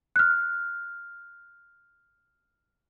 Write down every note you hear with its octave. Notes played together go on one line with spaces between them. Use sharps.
F6 F#6